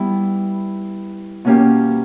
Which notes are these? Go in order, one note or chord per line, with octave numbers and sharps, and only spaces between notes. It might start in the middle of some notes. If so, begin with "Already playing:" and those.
Already playing: G3 B3 E4
B2 A#3 C#4 G4